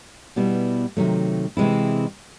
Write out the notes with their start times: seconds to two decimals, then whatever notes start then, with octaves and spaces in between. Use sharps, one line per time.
0.36 B2 G3 B3 E4
0.97 C3 D#3 F#3 A3
1.57 C3 E3 G#3 C4 E4